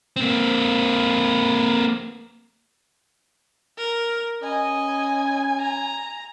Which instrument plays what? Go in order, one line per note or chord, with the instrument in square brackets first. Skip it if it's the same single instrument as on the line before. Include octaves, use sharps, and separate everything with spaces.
[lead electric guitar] A#3 C4
[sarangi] A#4
[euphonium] C#4 [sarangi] D#5 [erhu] G#5
[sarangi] A#5